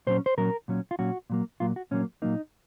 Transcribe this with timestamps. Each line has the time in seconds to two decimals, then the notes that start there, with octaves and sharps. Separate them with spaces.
0.07 A#2 F#3 C#4 C5
0.26 C5
0.38 A#2 F#3 C#4 A#4
0.68 A#2 F#3 C#4
0.91 F4
0.99 A#2 F#3 C#4 F#4
1.30 A#2 F#3 A#3
1.60 A#2 F#3 A#3 F4
1.76 F#4
1.91 A#2 F#3 A#3 C#4
2.22 A#2 F#3 A#3 D#4